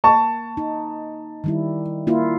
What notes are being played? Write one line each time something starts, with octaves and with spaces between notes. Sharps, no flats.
A#3 A5 C#6
D#4
D#3 G3 E4
A#3 E4 F4